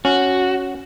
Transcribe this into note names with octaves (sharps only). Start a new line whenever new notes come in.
C#4 F#4